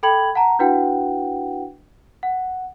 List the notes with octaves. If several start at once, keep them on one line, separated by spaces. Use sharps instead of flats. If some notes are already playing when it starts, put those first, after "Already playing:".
A4 G5 B5 G#6 F#7
F#5 A5 A#5
D4 E4 F#4 B4 F#5 G5
F#5